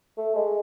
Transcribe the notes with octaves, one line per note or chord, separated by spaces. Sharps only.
A3
G#3